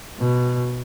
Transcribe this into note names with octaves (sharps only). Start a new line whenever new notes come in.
B2